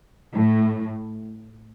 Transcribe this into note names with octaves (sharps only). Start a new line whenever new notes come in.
A2